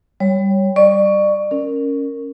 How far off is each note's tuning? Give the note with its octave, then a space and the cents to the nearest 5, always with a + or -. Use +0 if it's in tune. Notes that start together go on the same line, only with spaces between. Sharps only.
G3 +0 C#5 +0
D5 +30 C#6 +10
C#4 +0 A#4 -10